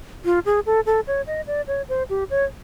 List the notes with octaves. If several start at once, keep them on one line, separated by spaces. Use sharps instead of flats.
F4
G#4
A4
A4
C#5
D#5
D5
C#5
C5
G4
C#5